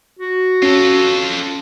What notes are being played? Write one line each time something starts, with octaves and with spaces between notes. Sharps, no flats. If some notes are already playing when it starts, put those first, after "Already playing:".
F#4
C#4 F4 A4